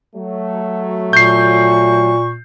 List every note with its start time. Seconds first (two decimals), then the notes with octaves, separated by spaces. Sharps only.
0.16 F#3 A3
1.13 A#2 C#6 G6 C7